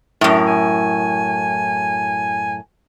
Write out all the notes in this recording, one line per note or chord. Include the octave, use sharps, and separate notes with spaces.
F#2 A2
G#5